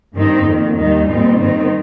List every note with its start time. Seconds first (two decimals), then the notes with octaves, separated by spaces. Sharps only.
0.14 G2 D#3 C4 D#4
0.45 F2 D#3 A#3
0.76 D#2 D#3 G3 D#4
1.08 A#2 G3 C4 D#4
1.39 G2 D#3 C4 D#4